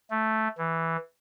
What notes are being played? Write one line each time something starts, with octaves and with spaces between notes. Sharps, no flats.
A3
E3